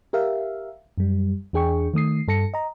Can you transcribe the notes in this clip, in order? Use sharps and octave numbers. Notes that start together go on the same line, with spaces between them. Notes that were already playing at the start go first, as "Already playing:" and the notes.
G4 A#4 E5 F5
F#2 G3
E2 D4 G#4 G5 C#6
D#3 A3 D#6 C7
G2 A4 A#6 C#7
D#5 A#5